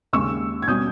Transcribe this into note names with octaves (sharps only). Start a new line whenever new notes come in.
D#2 C#3 G#3 C#6 E6
G#6
B2 G3 C#4 D#6 G6